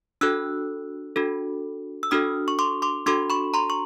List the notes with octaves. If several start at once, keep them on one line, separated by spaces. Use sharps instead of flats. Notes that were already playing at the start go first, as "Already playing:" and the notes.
D4 F#4 A4 E6 F#6
D4 F#4 A4
E6
D4 F#4 A4 D#6 F6
C#6
C6 D6
C6 D6
D4 F#4 A4 C6 D6
B5 C#6
A#5 C6
C#6